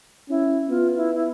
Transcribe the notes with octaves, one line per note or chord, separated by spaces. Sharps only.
C#4 E4
B3 F4
E4
E4